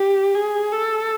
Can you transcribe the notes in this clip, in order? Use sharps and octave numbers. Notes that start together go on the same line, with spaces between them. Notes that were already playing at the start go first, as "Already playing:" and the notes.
Already playing: G4
G#4
A4